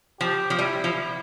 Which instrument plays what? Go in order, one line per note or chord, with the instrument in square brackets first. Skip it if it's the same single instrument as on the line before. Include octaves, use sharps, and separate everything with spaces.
[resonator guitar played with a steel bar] F3 [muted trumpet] G4
[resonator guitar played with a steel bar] F3
[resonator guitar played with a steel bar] G3 [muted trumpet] E4
[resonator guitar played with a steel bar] F3